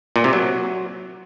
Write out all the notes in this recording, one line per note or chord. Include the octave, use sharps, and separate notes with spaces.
A#2
C3
F#3